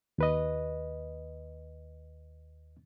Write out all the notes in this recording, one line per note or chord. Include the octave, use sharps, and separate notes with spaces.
D#2 B4 D#5